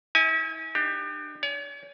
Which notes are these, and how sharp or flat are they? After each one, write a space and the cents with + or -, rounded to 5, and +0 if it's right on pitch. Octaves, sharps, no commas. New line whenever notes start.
E4 -40 G#5 +0
D4 +40 G4 +0
C#5 +45 G#5 +0